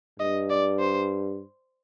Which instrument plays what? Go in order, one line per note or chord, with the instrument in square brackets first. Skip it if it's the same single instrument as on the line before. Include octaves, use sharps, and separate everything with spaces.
[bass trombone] G2 [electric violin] D#5
[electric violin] D5
C5